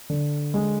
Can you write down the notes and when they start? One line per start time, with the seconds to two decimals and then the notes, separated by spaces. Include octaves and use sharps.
0.10 D3
0.54 G#3